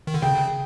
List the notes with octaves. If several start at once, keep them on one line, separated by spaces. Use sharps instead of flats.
D#3
D3
C#3 G5